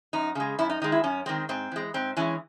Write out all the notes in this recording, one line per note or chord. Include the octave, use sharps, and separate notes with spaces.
F#2 D#4
C#3 G#3
F#2 E4
D#4
D#3 G#3 D#4
E4
F#2 C#4
D#3 G#3 C4
G#2 C4
E3 G#3
G#2 C4
E3 G#3 C#4